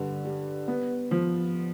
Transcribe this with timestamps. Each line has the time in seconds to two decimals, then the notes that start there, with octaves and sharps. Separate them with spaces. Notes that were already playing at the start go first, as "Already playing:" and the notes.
Already playing: G2 D3
0.25 G3
0.68 B3
1.11 F3